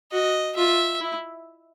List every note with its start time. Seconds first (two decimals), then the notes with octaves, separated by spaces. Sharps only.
0.12 F#4 D#5
0.56 F4 E5
1.01 E4